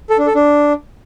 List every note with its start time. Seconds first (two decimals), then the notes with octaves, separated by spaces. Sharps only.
0.10 A4
0.18 D4
0.27 A4
0.35 D4